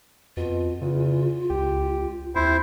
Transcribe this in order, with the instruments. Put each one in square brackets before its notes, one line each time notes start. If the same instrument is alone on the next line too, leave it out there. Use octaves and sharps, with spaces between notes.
[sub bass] F2 [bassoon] B2 [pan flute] F4
[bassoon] E2 [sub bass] C#3
[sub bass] C#2 [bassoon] G4
[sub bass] D#2 [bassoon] C4 [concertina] E4 C5